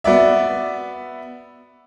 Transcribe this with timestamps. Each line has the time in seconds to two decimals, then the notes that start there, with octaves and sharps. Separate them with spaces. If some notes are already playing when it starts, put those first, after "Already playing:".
0.04 B3 F#4 D5 E5